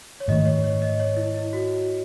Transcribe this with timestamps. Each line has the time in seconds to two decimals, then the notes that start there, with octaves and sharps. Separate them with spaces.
0.20 C#5
0.28 G#2 D#3 A3 D#5
0.46 C#5
0.64 C#5
0.82 D#5
1.00 C#5
1.17 E4
1.35 E4
1.53 F#4